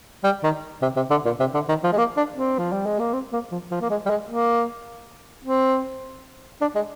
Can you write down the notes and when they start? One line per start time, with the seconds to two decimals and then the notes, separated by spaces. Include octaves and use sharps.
0.24 G3
0.43 D#3
0.82 C3
0.96 C3
1.10 D3
1.25 A#2
1.40 C3
1.54 D3
1.69 D#3
1.83 F3
1.92 G#3
1.97 A#3
2.17 D4
2.36 C4
2.58 F3
2.72 G3
2.86 G#3
2.99 A#3
3.13 C4
3.33 A#3
3.52 F3
3.71 F3
3.81 A#3
3.90 G#3
4.06 G3
4.10 G#3
4.29 A#3
5.45 C4
6.61 D4
6.75 G#3